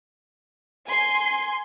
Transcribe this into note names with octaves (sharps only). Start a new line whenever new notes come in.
G#5 C6